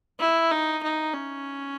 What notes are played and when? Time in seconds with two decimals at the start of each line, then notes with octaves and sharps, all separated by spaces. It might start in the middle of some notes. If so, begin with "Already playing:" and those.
0.20 E4
0.51 D#4
0.83 D#4
1.14 C#4